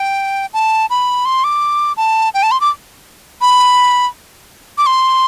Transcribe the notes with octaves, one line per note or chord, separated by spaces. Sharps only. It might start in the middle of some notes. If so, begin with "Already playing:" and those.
Already playing: G5
A5
B5
C6
D6
A5
G5
A5
C6
D6
B5
D6
C6